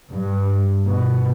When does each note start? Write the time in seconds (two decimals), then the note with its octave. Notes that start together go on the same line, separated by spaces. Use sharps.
0.11 G2
0.87 B2